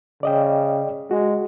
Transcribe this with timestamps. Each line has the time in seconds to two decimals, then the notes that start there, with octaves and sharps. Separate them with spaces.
0.23 C#3 D5 D#5 G5
1.11 G#3 F#4